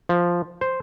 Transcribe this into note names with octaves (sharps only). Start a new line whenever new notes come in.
F3
C5